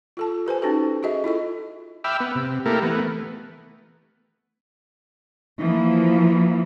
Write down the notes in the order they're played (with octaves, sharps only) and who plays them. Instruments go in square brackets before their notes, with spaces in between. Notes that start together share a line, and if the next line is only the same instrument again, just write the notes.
[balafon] F4 A4 A5
G4 B4 C5 G#5
C#4 D#4 F#4 A4
F#4 G#4 D#5 E5
E4 F4 A4 D#5
[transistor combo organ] E5 G5 B5 D6 E6 F6
B3
C3
A3 A#3 E4 G4 A4 A#4
E3 A3 B3
[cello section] E3 F3 A#3